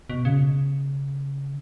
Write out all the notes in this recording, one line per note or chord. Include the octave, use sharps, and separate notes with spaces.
B2
C#3